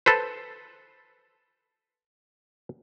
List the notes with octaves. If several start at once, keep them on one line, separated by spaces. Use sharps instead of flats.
A4 B4 C5